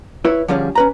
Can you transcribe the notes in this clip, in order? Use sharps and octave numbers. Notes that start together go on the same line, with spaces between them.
E4 B4 C#5
D3 F3 G3 C#4 G#4
C#4 B4 A#5